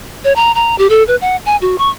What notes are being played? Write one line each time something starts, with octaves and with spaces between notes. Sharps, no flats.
C#5
A#5
A#5
G4
A4
B4
F#5
G#5
F#4
C#6